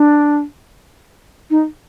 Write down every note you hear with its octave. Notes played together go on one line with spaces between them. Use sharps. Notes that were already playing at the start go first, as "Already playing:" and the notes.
Already playing: D4
D#4